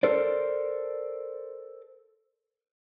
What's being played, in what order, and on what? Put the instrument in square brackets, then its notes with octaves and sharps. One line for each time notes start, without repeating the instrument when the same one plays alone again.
[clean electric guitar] A4 A#4 C5 D5